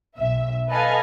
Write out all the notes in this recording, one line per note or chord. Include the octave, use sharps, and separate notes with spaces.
B1 E5
A4 B4 D#5 F5 G#5